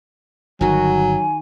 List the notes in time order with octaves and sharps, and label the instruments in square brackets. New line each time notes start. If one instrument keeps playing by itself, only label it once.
[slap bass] G1 [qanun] D#3 F#4 [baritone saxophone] F#3 [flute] G#5